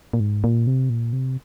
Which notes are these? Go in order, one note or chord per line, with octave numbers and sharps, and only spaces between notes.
A#2
G#2
A#2
C3
A#2
C3